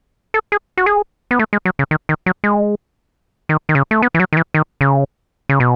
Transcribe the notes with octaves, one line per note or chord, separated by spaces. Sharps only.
A4
G#4
F#4
G#4
B3
A3
G#3
F#3
C#3
D#3
D#3
F#3
G#3
D#3
D#3
C#3
A3
B3
E3
F#3
D#3
E3
D#3
C#3
C#3
B2